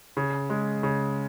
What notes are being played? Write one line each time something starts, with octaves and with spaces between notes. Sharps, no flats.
C#3
G#3
C#3